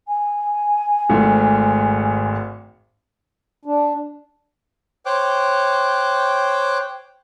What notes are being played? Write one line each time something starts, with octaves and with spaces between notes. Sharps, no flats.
G#5
G#1 G#2 A3
D4
C5 C#5 G5 D6 F#6